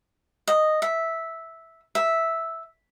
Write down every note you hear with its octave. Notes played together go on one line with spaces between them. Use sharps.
D#5
E5
E5